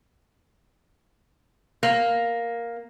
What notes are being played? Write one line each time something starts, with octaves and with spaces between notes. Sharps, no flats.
A#3